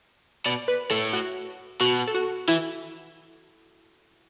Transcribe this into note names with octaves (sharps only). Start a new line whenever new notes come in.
B2 D5
B4
A2 A4
F#4
B2 F#4
A4
F#4
E3 E4